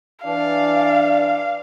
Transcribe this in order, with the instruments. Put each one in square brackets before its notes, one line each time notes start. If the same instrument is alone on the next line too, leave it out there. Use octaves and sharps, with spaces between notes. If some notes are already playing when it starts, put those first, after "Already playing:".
[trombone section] E3 D4 [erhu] F5